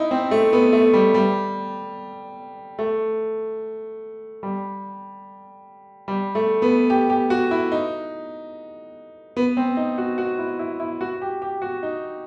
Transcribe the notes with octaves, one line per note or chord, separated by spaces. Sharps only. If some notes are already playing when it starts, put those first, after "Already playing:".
Already playing: D#4 E4
C4
A3
B3
A3
G3
G3
A3
G3
G3
A3
B3
G4
G4
F#4
E4
D#4
B3
C4
D#4
F#4
F#4
E4
E4
E4
F#4
G4
G4
F#4
D#4